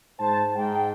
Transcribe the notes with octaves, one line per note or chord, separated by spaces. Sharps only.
G#2 C5 A5
G#2 G5